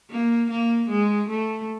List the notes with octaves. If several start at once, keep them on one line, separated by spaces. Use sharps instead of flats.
A#3
A#3
G#3
A3